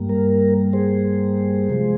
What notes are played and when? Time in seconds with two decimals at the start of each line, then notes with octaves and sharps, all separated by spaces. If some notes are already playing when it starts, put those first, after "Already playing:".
Already playing: G2 G3 A#3
0.09 A#4
0.73 G#4 C5
1.69 C3 F3 G#3